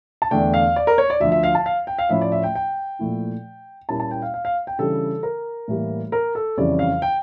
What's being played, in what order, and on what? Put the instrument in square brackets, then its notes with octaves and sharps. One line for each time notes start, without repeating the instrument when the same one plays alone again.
[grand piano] A5
E2 D3 A3 D4 G5
F5
D5
A#4
C#5
D5
D2 D3 F3 E5
E5
F5
A5
F5
G5
F5
A2 F3 C#4 E4 E5
D5
E5
G5
G5
A#2 F3 A3 E4
A#2 G3 A#3 C#4 E4 A5
A5
G5
F5
F5
F5
G5
C#3 E3 G3 D4 A4
A#4
A2 E3 G3 A#3
A#4
A4
F2 C#3 E3 G3 C#4 D5
F5
G5